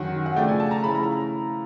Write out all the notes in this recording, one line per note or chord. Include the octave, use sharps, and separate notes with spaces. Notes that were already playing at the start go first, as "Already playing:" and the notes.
Already playing: F#2 D#3 F#3 F#5
F#5
C#3 F3 A3 D4 G5
G#5
A5
A#5
C#3 F3 A3 C#4 E4 B5
A#5